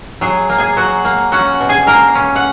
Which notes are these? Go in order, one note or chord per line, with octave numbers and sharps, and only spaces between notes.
F#3 G#4 G#5
A#3
G#4 G#5
F#3 F#4 F#5
A#3
C#4 F#4 F#5
B2
G#4 G#5
A#3 A#4 A#5
C#4
F#5